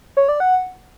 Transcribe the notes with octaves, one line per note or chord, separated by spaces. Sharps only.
C#5
D5
F#5